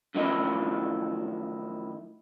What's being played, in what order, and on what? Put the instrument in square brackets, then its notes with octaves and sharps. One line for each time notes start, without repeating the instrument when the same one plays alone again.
[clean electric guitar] F#2 A2 D#3 F3 D#4 E4